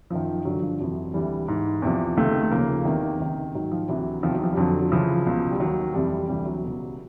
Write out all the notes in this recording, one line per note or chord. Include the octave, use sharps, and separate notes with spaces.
F#2 D#3 F3
G2 D3 F3 F#3
F3
F2 C3 E3 F#3
D2 C3 E3 G3
G#2 E3
E2 C3 F3
C#2 C3 D#3 A3
A3
D#2 C#3 F3 A#3
E2 C3 D#3
C#2 C3 D#3
G#2 D#3 F#3
F3
D2 C3 E3 F#3
E2 C3 D#3 F3
F#3
F3
G3
F2 D3 F3 F#3
F#3
C#2 C#3 E3 F3
C#2 B2
G3
D#2 D#3 F#3
F2 C3 E3 G3
D2 C3 E3 G3
F#3
C#2 B2